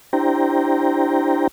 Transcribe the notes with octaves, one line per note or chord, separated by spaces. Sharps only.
D4 E4 G4 C5 G5 A#5